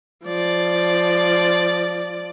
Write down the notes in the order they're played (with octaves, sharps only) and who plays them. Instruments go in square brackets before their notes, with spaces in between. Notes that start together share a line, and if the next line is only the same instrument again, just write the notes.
[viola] F3 D5